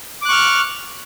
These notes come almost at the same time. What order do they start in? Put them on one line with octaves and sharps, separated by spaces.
D6 F#6 C#6 F6